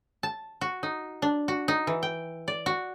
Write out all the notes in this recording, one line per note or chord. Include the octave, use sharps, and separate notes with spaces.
A5
F#4
D#4
D4
F#4
D#4
E3
G5
D5
F#4